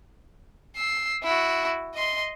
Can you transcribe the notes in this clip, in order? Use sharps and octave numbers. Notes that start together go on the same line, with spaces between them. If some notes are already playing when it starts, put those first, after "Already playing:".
E6 C7
E4 F#4
D#5 C6